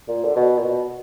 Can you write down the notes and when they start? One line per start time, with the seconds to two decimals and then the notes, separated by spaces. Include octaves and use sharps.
0.08 A#2
0.25 D3
0.36 B2
0.58 A#2
0.64 B2